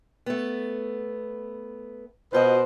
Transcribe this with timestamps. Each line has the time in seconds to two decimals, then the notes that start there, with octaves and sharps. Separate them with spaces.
0.26 A3 B3
2.33 B2 F4 F#4 B4 C5 D#5